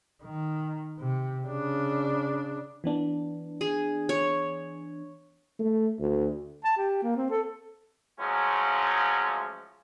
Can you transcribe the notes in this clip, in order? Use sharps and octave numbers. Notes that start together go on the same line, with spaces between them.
D#3
C3
C#3 D4
E3 B3 D4
G#4
C#5
A3
D2
A5
G4
A#3
C4
A4
F3 F#3 G#3 A3 C#4 F4